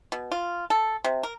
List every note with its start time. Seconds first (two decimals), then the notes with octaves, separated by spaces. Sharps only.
0.12 B2
0.32 F4
0.70 A4
1.04 C3
1.23 A#4